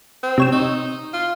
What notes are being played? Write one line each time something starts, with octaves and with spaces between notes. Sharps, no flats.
C4
C3 C#5 E6
D#4
F4